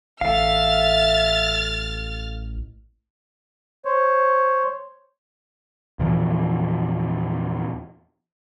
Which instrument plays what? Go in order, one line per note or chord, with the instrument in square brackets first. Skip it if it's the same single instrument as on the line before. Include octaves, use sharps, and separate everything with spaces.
[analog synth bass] A1 [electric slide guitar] A4 F5 [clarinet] E5 [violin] F6 A6
[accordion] C5 C#5
[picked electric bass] E2 A#2 E3 F3